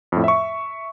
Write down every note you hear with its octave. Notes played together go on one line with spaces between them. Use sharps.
F2 A2
E5 C#6